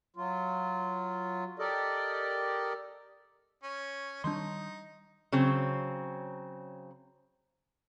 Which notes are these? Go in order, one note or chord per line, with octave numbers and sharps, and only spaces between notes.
F#3 F4
G4 A4 A#4 D5 D#5
C#4
D#3 G3 D4 D#4 C6
C#3 F#3 C4